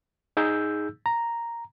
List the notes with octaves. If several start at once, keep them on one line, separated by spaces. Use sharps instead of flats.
D#4 G#4 E6 G6
A#5